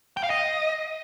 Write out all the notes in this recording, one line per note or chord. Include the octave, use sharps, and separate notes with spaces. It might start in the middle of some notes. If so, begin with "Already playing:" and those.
G5
F5
D#5